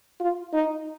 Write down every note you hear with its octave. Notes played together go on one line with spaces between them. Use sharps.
F4
D#4